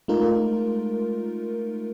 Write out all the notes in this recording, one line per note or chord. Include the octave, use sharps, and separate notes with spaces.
G#3 A3 D#4 F4 A#4